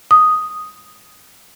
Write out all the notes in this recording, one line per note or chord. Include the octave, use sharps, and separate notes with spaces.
D#6